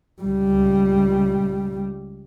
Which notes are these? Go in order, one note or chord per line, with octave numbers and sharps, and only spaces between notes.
C#2 G3